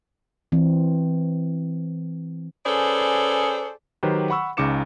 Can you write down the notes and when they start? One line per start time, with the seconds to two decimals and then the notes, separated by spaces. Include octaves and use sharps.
0.52 E3 C4
2.65 C#4 G#4 A4 B4 C5 D5
4.03 D#3 F#3 G4 B4 C5
4.30 F#5 B5 C#6 E6
4.57 C#2 C#3 D#4 D6 C#7 E7